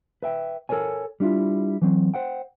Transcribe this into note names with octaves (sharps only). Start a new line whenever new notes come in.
B4 E5 G5
A4 A#4 C5 C#5 G#5
G3 D4 E4 F4
E3 F#3 C4
C5 F#5 G5